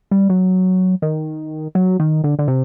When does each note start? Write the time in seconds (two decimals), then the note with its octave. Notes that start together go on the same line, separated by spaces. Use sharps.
0.11 G3
0.30 F#3
1.02 D#3
1.75 F#3
2.00 D#3
2.24 D3
2.39 D3
2.48 C3